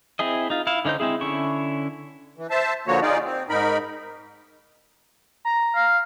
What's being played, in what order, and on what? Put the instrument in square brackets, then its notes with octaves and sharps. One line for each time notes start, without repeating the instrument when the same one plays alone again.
[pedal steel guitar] C4 E4 G#4 D#5
D#4 F4
E4 F5
D3 C#4 D#4 C5 G6
G#3 C4 E4 G#4
D3 C#4 E4 C#6
[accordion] E3
C5 E5 A5
D3 F3 A#3 F#4 C#5
D#4 F4 G#4 D5
C4
G#2 D#4 A#4 B5
[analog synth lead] A#5
[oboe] F5